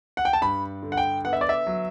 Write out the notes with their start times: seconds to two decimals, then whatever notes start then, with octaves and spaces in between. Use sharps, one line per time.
0.17 F#5
0.25 G5
0.33 A5
0.41 G2 B5
0.83 D3
0.92 F#5
0.97 G5
1.25 B3 F#5
1.33 E5
1.41 D5
1.49 E5
1.67 F#3